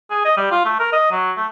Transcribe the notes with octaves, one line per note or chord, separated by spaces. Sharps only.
G#4
D#5
G3
F4
A3
A#4
D#5
F#3
A3